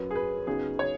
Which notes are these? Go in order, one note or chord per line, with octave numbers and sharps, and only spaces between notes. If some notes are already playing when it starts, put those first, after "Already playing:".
Already playing: F#2 F#3 C#4 B4
G#4
B4
C#3 F#3 B3 D#4 G#4
C#5